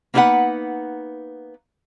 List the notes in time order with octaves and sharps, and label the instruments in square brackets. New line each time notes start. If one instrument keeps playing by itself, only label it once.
[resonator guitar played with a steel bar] A#3 B3 D#4 A4 B4 F#5